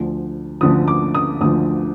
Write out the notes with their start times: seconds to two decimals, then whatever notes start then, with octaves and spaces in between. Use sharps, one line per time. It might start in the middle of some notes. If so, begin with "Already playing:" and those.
Already playing: D2 D3 F3
0.61 D2 D3 F3 D#6
0.88 D6
1.15 D#6
1.41 D2 D3 F3 D#6